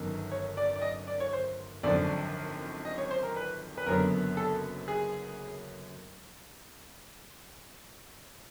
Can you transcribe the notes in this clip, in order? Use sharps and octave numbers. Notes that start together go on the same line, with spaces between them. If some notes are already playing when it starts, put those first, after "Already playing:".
Already playing: G1 F#2 D#3
C#5
D5
D5
D#5
D5
C#5
C5
G#1 F#2 D3 F3 D5
D#5
C#5
C5
A#4
B4
B4
F#1 F#2 D3 F#3 B3 A#4
A4
G#4